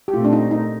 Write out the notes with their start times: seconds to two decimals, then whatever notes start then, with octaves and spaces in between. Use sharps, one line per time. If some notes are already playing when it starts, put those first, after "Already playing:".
0.08 G4
0.13 A#2 A3 C4 F4
0.25 D4
0.33 D#4
0.51 D#4